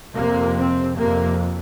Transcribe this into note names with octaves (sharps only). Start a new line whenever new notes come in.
F2 C3 A#3
C4
F2 C3 A#3